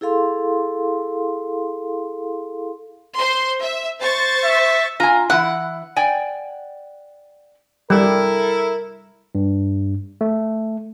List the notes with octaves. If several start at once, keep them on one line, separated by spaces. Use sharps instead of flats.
E4 G#4 A4 F5 C6
C5 C6
E5
C5 C#6 A6
E5
F4 G#5 A#5
E3 E4 F#5
D5 G5 G#5
G3 E4 A4 A#4
G2
A3